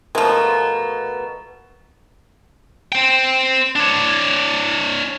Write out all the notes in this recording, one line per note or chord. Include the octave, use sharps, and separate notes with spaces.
B2 F3 G#3 A3 A#4
C5 G5
D4 C#5